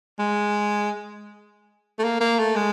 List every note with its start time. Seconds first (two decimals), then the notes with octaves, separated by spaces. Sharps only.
0.19 G#3
1.99 A3
2.04 A#3
2.21 A#3
2.39 A3
2.56 G#3